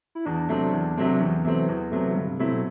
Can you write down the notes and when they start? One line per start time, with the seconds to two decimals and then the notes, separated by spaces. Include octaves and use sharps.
0.15 E4
0.26 E2 D4
0.49 C3 F#3 A3 C4
0.73 E2
0.97 C3 F#3 A3 C4
1.20 E2 E3
1.45 C3 F#3 A3 C4
1.69 E2
1.92 C3 F#3 A3 C4
2.15 G2 D3
2.27 C3
2.39 C3 F#3 A3 C4 E4
2.52 B2